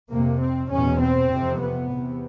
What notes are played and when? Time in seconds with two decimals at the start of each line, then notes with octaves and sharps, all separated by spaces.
0.10 F2 C3 A#3
0.41 C4
0.70 E2 B2 C#4
1.00 C4
1.30 F2 C3
1.60 B3
1.90 E2 C3